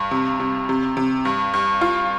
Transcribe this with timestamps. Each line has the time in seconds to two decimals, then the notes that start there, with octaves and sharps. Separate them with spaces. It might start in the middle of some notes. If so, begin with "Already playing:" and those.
Already playing: G2
0.11 C3
0.40 C3
0.69 C3
0.97 C3
1.25 G2
1.54 G2
1.81 F4